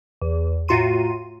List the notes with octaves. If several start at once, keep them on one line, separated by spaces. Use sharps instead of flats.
E2
A2 F4 F#4 A#5 C6 D#7